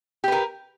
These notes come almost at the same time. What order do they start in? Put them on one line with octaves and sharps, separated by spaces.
G4 B4 A#4